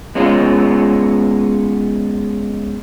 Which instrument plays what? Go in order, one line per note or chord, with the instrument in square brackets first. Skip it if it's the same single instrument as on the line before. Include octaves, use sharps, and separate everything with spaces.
[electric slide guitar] G#3 B3 C#4 F4